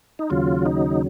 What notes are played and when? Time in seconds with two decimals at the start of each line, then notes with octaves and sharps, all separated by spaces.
0.19 D#4
0.30 D#2 C#3 F#3 F4
0.66 D#4